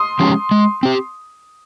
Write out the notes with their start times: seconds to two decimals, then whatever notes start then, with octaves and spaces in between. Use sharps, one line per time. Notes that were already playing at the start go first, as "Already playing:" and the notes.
Already playing: C6 D#6
0.20 F3 G#3 C#4 G4
0.51 G#3
0.83 C4 G4